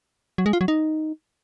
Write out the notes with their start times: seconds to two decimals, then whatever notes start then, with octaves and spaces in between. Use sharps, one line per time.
0.38 F#3
0.46 G#3
0.53 F4
0.61 F#3
0.68 D#4